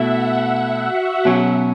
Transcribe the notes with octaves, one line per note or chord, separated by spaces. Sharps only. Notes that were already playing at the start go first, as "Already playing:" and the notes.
Already playing: B2 A3 E4 E5 F#5
E5
F#4
B2 F#3 C#4 G#4